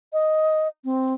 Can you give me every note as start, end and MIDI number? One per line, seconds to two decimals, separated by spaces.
0.13 0.68 75
0.85 1.14 60